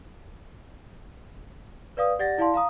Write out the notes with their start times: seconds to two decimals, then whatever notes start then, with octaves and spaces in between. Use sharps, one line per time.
1.97 B4 D5 F5 D#6
2.19 G4 D5 F#5 A6 A#6
2.38 E4 D5 F5 A5 C6
2.54 F5 A#5 D#6